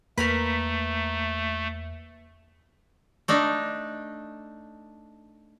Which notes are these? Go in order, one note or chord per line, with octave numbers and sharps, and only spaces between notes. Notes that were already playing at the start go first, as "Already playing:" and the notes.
E2 A3 A#3 A#4 B4 A#5 B5
A3 D4 D#4